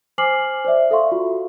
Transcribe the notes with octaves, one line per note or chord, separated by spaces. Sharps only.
C5 G#5 D6 F6 C7 F#7
C5 D5 E5
A4 E5 F5 C6 C#6
F4 F#4